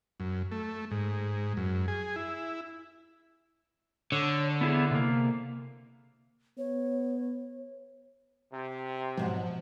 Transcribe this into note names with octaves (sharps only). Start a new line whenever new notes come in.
F#2
A3
G#2
F#2
G#4
E4
D3 C#5
B3 E4 G#4
C3 A#3
B3 C#5
C3
G#2 B2 F3 F#3